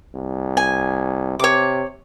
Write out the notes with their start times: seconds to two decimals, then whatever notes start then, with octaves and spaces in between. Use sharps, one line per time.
0.15 C2
0.57 G#5
1.39 C3 C#5 D6